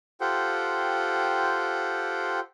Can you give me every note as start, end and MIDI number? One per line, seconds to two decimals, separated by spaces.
0.21 2.40 65
0.21 2.40 67
0.21 2.40 69
0.21 2.40 72
0.21 2.40 78
0.21 2.40 79